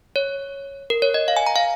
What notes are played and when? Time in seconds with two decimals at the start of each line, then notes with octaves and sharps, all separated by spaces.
0.16 C#5
0.90 A#4
1.02 C#5
1.14 D#5
1.28 F5
1.37 G#5
1.46 A#5
1.56 F5